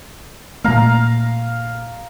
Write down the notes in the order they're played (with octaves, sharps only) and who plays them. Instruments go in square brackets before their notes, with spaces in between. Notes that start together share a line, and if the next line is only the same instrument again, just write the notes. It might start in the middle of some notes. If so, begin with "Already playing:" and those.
[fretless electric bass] A#2 A3 A#3 [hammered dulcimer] F5 A#5